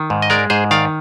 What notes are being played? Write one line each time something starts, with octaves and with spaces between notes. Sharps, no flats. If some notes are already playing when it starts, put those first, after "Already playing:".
Already playing: D#3
G#2
D#5
G#3 A#4 D5
G#2 G#4 C5
D#3 D5 F5